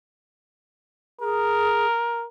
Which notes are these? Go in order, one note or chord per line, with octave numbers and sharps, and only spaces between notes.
G#4 A#4